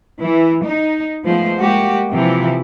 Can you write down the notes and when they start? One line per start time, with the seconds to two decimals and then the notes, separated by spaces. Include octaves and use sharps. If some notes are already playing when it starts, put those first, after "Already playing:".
0.21 E3
0.65 D#4
1.25 F3 G#3 A3 B3 C5
1.59 G#3 A#3 F#4 G4
2.12 C3 E3 F3 E4